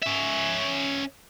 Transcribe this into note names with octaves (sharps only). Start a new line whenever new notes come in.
C#4 E5